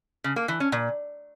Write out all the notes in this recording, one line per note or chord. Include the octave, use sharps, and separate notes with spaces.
C#3
A#3
E3
C#4
A#2